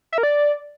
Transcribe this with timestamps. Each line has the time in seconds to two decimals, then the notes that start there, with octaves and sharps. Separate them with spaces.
0.13 E5
0.18 A#4
0.23 D5